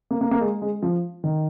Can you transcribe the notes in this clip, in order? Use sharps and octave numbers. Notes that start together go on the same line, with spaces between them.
A#3
A#3
A#3
G#3
G#3
F3
D#3